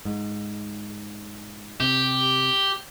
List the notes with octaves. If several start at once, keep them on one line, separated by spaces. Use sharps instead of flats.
G#2
C3 G4